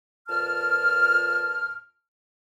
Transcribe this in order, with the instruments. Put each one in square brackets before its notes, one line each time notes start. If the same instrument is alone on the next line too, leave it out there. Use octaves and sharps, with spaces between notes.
[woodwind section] F2 A#2 B4 A5 F6